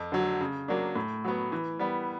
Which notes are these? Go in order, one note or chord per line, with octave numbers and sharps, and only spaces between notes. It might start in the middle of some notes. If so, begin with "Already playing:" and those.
Already playing: F2
D3 F#3
C#3
F#3 A#3 D4
A2
F#3 B3
E3
G3 B3